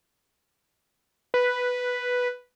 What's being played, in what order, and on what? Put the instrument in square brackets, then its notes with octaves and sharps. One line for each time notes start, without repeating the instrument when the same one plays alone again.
[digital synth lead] B4